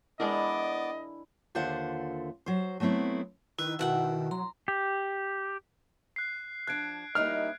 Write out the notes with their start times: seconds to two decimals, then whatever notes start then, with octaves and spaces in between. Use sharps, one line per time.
0.20 G#3 B3 D4 E4 A#4 D5 D#5 D6
1.55 D#2 D3 F4 C5 E5 F#5
2.46 F#3 C5
2.80 F#3 A3 B3 C4 E4
3.59 D#3 E4 B4
3.79 B2 D#3 E5 F#5 G5
4.31 F#3 A#5 C6
4.68 G4
6.16 F#6 C7
6.67 F3 D4 F#6 G#6 D7
7.15 G3 A#3 C#4 D#4 E4 D#5 F6